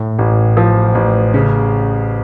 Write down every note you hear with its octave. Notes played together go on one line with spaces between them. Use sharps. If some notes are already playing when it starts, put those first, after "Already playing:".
Already playing: A2
A1
F3
A1
C#3